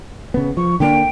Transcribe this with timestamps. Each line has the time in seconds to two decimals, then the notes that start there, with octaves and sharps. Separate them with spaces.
0.34 C#3 B3
0.57 F3 C#6
0.80 D3 A#3 D4 G5